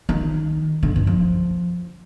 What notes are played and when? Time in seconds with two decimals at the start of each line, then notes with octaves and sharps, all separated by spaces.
0.09 D#3
0.83 D3
0.96 G2
1.07 F3